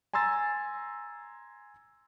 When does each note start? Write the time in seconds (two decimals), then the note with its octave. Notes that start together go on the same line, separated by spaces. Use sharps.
0.13 G#5 A#5 C6 E6 A6